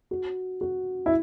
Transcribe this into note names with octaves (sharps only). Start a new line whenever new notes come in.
F#4
F#4
E4